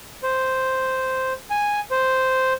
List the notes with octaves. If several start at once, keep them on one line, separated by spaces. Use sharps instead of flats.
C5
G#5
C5